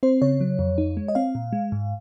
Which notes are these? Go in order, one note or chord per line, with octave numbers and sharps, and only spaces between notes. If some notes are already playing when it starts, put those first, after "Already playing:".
C4 C5
C#3 C#5
F#3
F2
D#4
G#3
D#5
C4 F5
A#2
G#3
G#2